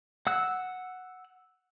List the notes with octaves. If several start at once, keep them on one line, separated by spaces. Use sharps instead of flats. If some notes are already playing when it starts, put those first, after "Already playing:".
F#5 E6 F#6